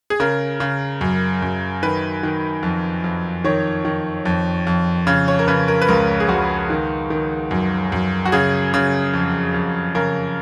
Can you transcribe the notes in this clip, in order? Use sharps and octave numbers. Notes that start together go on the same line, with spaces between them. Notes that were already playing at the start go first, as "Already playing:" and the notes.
G#4
C#3 A#4
C#3
F#2
F#2
D#3 B4
D#3
F2
F2
D#3 C#5
D#3
F2
F2
C#3
C#5
A#4
C#3 B4
A#4
B4
C#2 A#4
G#4
C#2 F#4
D#3
D#3
F#2
F#2
F#4
C#3 G#4
C#3
F2
F2
C#3 A#4